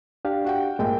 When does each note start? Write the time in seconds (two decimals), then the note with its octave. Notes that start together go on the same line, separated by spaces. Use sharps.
0.25 D4 G4 F5
0.44 F#4 F#5 G5
0.79 A#1 G#3 A#3 G5